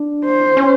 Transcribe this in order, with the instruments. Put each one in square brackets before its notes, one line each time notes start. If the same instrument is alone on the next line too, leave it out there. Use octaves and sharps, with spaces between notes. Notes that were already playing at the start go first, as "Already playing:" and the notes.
Already playing: [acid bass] D4
[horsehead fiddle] C5
[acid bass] C#4